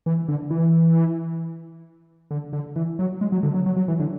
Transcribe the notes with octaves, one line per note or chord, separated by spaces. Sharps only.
E3
D3
E3
D3
D3
E3
F#3
G#3
F#3
D3
F#3
F#3
F#3
E3
D3